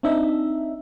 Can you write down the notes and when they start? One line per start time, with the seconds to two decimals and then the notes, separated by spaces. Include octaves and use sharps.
0.03 C4 D4 D#4 E5